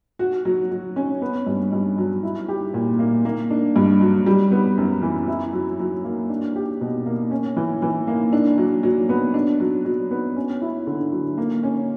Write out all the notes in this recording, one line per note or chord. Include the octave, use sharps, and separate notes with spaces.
F#4
F#3
F#3
C#4
B3
G2
G2
F#3
E4
G4
A#2
A#3
A#3
D4
G2
F#3
G3
B3
F#2
E3
E4
F#3
F#3
A#3
D4
G4
B2
A#3
C#4
E3
E3
A#3
D4
F#3
F#3
B3
D4
F#3
F#3
B3
C#4
E4
D3
F#3
A#3
C#4